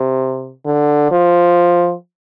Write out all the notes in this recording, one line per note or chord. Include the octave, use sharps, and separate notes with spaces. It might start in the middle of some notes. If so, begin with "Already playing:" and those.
Already playing: C3
D3
F3